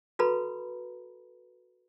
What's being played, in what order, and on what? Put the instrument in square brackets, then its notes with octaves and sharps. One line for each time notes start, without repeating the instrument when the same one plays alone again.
[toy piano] F#4 A4 B4 A#5 B5